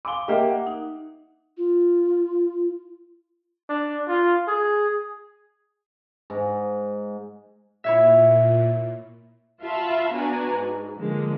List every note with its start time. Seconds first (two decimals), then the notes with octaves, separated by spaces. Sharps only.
0.05 F5 G#5 C6 D6 G7
0.28 A#3 G4 D#5 E5
0.50 F#5
0.67 D#4
1.57 F4
3.69 D4
4.08 F4
4.48 G#4
6.30 G#2
7.84 A#2 E4 C#5 E5
9.62 F4 F#4 E5 F5 A5 B5
10.13 B3 D4 F#4 B4 G#5 A#5
10.50 G#2
10.97 D3 F3 G#3 A#3